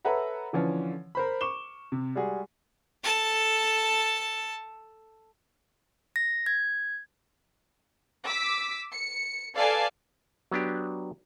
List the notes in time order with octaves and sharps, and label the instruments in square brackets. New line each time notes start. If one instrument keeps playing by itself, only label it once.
[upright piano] A4 B4 C#5 E5 F#5 A#5
D3 E3 F3 C#4
A#4 C5 B5
C#6 D6 E7 G7
C3
G3 G#3 F#4 G#4
[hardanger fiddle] A4 A5
[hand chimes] A#6
G#6
[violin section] D6 E6 B6
C#7
A4 B4 D5 F5 G#5 A5
[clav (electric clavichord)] F#3 B3 D4 G4